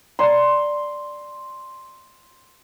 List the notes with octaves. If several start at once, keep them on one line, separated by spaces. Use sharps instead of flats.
D5 A5 A#5 C6